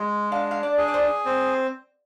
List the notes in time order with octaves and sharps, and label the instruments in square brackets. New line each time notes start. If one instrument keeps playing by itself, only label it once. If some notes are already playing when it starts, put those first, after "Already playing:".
Already playing: [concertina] G#3
[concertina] D4 [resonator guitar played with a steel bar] F5
[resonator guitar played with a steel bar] F5
D5
[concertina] G#4
[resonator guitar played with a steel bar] D5
C5
[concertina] C4